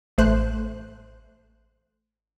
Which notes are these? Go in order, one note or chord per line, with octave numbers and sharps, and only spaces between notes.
A1 A3 C5 F#6